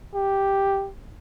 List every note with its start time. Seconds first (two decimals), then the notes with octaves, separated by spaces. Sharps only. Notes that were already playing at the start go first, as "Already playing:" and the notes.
0.14 G4